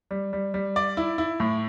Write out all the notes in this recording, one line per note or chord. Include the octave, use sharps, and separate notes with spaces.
G3
G3
G3
D5
E4
E4
A2